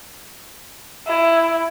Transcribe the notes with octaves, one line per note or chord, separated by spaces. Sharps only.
E4